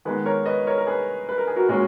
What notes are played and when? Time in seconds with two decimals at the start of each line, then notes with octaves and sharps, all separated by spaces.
0.05 D#3 G#3 B3 G#4 B4
0.25 A#4 C#5
0.46 B4 D#5
0.67 A#4 C#5
0.78 A#4
0.87 G#4 B4
1.29 B4
1.38 A#4
1.47 G#4
1.56 F#4 A#4
1.68 A#2 G#3 C#4 F#4 A#4